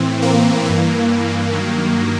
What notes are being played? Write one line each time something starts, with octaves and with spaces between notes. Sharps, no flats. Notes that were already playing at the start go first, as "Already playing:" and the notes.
Already playing: A2 E3 C4
A#3
G2 E3 A#3
G2 D#3 F#3